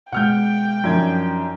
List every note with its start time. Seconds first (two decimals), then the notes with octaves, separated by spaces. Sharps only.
0.12 B2 G#3 F#5 G5 F6 G6
0.84 F#2 F3 D4 D#4 G#6